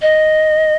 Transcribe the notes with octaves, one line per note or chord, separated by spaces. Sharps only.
D#5